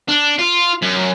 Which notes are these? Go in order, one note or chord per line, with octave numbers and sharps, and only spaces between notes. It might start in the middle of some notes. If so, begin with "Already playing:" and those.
D4
F4
F#2